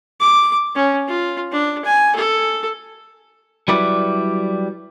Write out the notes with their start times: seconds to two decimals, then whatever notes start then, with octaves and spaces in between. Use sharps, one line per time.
0.20 D6
0.75 C#4
1.08 F4
1.52 D4
1.85 G#5
2.15 A4
3.68 F#3 G3 E4 B4 D5